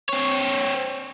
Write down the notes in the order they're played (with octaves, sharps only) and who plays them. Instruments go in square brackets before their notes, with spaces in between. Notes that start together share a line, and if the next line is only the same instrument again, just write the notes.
[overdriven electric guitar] C4 C#5